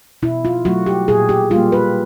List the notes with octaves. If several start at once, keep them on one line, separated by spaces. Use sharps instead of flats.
B2 E4
F4
F#3 A3 F#4
G4
A#2 G#4
G4
G3 A#3 F4
B4